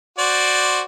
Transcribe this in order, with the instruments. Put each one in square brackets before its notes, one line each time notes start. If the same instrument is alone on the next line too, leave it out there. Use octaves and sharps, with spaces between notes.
[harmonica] F#4 C5 D5